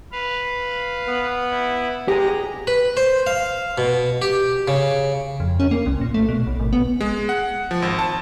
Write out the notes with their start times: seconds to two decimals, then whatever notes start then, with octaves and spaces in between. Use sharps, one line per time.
0.12 B4 F5
1.08 B3
1.50 E4
2.08 G#3 G4 G#4 D#5 A#5 A#6
2.67 B4
2.97 C5
3.27 F5
3.78 B2
4.22 G4
4.68 C#3
5.40 F2
5.60 C#4
5.71 A#3
5.86 C2
6.01 A#2
6.14 A3
6.29 B2
6.47 B1
6.60 G#1
6.73 B3
7.01 G#3
7.29 F#5
7.71 F3
7.82 G#1
7.99 A5